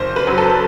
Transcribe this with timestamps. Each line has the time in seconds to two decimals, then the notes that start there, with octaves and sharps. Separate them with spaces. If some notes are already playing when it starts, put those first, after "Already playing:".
Already playing: F#1 C5
0.16 B4
0.27 F#2 F#3
0.38 A4